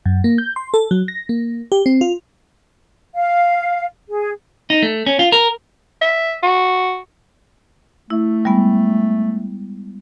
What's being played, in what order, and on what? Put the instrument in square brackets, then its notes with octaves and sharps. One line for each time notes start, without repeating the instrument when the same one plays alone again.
[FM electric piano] F#2
A#3
G6
C6
A4
F#3
A#6
A#3
G4
C4
F4
[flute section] F5
G#4
[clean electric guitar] D#4
A3
C#4
F4
A#4
[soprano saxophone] E5
F#4
[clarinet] A3 [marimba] E4
[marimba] G3 G#3 B3